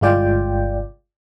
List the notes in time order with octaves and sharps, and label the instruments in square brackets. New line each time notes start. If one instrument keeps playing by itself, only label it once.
[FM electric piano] G1 C2 G#3 F4 D5 G5